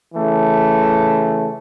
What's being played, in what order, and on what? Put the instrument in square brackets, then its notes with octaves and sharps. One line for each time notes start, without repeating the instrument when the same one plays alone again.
[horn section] C#3 E3 A3